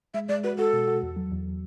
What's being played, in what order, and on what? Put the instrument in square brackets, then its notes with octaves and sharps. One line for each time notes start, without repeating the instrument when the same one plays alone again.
[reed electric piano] G#3 [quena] E5
[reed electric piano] G#3 [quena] D5
[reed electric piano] F#4 [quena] B4
[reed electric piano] F#4 [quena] A4
[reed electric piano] B2
F#4
E2
F#3
E2